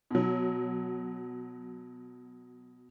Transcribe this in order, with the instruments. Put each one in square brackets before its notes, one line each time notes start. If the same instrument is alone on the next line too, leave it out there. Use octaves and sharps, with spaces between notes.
[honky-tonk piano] B2 F#3